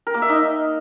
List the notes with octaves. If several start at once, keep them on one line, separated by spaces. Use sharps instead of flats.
A#4
A#3
E5
D#4